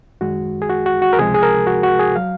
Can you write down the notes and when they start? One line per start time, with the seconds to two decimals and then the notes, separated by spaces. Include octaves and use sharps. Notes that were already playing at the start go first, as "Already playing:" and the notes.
0.21 F#2 D#3 G#3 F#4
0.62 G#4
0.70 F#4
0.86 F#4
1.02 F#4
1.13 A#4
1.18 C#2 C3 F3 G#3 G#4
1.34 G#4
1.43 A#4
1.67 F#4
1.83 F#4
1.99 G#4
2.16 F#3 F5